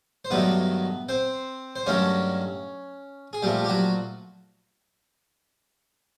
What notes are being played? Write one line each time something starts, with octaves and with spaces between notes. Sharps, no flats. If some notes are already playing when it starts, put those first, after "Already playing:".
C5
G2 D#3 F#3 A3 B3 B4
C4 C5
C5
G2 D#3 F#3 A3 C#4 C#5
G#4
A#2 F3 G3 A3 G4
G4
F#3 F#4